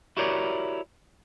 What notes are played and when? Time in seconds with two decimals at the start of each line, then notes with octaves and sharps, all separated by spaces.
0.17 E4 F#4 G4 A#4 C#5 D5